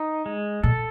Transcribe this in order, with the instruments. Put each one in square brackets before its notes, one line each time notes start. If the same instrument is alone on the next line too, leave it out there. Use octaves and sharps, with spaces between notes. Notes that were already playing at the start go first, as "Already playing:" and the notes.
Already playing: [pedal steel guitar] D#4
G#3
[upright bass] A#2 [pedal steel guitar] A4